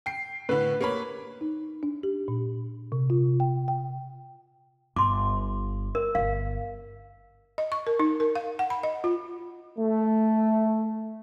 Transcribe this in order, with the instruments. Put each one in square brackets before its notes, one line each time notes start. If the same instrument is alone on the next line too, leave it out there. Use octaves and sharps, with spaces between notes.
[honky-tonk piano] G5 C7
[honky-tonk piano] A2 D3 [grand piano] B4
[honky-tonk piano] A#3 C#5 B5
[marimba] D#4
D4
G4
A#2
C3
F4
G5
G5
[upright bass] G1 [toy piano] C6 D6
[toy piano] A#4
[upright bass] G1 D3 [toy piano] F5
[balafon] D#5
C#6
A#4
D#4
A#4
F5
F#5
B5
D#5
F4
[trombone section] A3